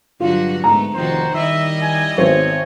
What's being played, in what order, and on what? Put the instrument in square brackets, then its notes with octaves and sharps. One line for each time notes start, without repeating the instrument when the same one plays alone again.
[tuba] G2 [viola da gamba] D3 F#3 F#4 [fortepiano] F4
[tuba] G#2 [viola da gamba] A3 B3 [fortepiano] A#5
[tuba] F1 [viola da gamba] D#3 F3 F#4 [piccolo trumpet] C5
[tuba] D#3 [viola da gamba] G3 E4 D#5 [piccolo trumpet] E5
[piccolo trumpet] G#5
[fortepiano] G#1 C5 [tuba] B3 [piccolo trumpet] C#5